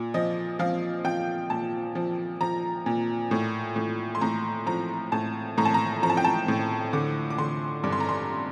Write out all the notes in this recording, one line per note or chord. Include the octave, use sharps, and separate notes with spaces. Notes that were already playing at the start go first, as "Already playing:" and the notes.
Already playing: A#2
F3 D#5
F3 F5
F3 G5
A#2 A5
F3
F3 A#5
A#2
A2
A2
C6
A2 A#5
F3 A#5
A2 A5
A2 A#5
A5
A#5
F3 A#5
A5
G5
A5
A2
D3 D6
D6
D3 C6
G2 D6
C6
A#5
C6